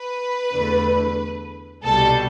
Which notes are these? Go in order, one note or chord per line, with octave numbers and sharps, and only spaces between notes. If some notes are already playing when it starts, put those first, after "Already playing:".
Already playing: B4
E2 D3 A3
C2 B2 G3 A4